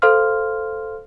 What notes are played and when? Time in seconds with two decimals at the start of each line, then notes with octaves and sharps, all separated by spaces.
0.02 A4 C5 F5 C6 F6